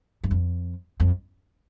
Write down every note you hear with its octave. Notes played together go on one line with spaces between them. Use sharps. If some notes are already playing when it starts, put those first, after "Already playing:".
G2
F2
F2